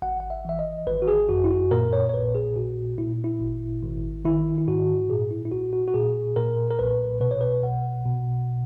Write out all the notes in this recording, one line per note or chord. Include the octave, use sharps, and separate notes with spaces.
G#1 F#5
F#5
E5
E3 E5
D#5
G#1 B4
F#4
G#4
F#2 F#4
E4
F#4
A#2 A#4
C#5
C#5
A#1 B4
G#4
A#2 F#4
A#2 E4
E4
G#1
G#1
D#3 E4
E4
G#2 F#4
A#2 G#4
E4
E4
B1 F#4
F#4
F#4
A#2 G#4
A#2 A#4
A#4
B1 B4
B2 B4
C#5
B4
B1 F#5
B2